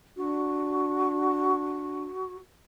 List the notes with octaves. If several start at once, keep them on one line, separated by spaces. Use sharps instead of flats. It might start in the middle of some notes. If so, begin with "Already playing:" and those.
D4 F#4